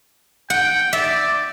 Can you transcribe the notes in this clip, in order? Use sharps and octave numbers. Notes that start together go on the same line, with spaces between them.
F#5 G5
D5 E5